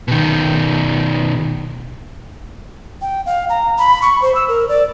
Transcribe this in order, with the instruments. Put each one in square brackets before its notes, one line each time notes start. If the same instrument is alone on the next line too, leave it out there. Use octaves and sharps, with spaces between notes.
[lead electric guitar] B2 D#3
[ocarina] G5
F5
A#5
B5
C#6
C5
E6
A#4
D5